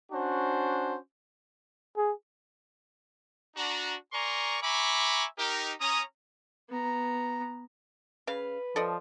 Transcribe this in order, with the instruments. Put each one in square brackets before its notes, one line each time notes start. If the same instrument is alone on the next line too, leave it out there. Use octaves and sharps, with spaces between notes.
[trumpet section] C#4 D4 F#4 C5
[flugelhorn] G#4
[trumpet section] D4 F#4 A#5
A#4 D5 G#5 A#5 C6 C#6
E5 G#5 A#5 B5 C#6 D6
D#4 G4 A#4
C#4 A#5 D#6
[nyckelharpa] B3 A#5
[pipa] C#3 F5 [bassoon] B4
[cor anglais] F3 [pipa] A4 D5 D#5